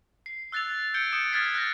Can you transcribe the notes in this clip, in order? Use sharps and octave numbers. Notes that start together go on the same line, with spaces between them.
C7
E6 F#6 A6 C7 F7
G6 G#6 C#7 D7 G7
D#6 C#7 D7 E7
D#6 F6 G#6 A6 B6 C7
F#6 G6 A#6